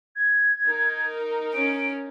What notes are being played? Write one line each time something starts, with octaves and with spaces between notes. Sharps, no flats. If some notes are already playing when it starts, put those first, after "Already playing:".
G#6
D#4 A#4
C#4 D7